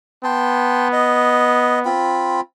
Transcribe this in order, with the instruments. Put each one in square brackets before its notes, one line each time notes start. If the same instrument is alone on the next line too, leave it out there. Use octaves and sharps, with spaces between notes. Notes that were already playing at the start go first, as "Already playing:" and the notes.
[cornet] B3 [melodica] G5 A5 C6
[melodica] D#5
C4 F4 B5